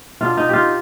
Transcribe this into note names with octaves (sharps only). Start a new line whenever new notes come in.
B2 B3 D4 F4
D#4
F4 G4